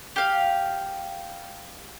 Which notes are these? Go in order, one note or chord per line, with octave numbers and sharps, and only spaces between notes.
G4 F5